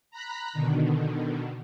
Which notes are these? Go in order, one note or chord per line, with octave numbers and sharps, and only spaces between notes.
A#5 B5 F#6 B6
B2 D3 D#3